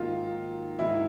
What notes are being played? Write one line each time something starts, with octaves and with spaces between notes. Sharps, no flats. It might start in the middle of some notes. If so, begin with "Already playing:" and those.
Already playing: G#2 D#3 F#3 A#3 D#4 F4
G#2 D#3 F#3 A#3 D#4 E4